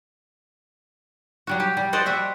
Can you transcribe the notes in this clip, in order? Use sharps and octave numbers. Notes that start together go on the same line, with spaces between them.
F#3 G3 F#4
G4
G3
F#4 C5 D5 D#5
G3 F#4 E5